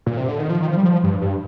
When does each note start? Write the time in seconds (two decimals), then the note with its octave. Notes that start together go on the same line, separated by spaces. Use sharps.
0.06 A#2
0.17 C3
0.28 D3
0.39 D#3
0.50 F3
0.62 D#3
0.68 F3
0.77 G3
0.85 F3
1.04 G2
1.21 G2